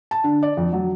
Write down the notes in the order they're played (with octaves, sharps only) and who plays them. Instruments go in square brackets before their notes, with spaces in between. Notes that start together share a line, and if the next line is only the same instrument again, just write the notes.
[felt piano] A5
D3
D5
F2
F#3